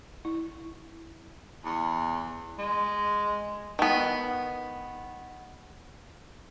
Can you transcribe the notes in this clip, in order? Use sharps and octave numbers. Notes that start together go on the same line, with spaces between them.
E4
E2
G#3
D#3 B3